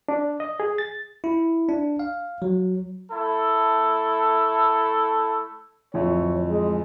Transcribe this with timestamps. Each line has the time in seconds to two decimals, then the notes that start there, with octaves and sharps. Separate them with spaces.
0.09 D4
0.40 D#5
0.60 G#4
0.78 A6
1.24 E4
1.69 D4
1.99 F5
2.42 F#3
3.12 A3 E4 A4
5.94 D1 F2 C#5 E5
6.49 G#3 G#4 D#5